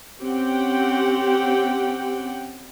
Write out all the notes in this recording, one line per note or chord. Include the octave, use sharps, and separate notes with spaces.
C4 C#4 G4 F#5 G5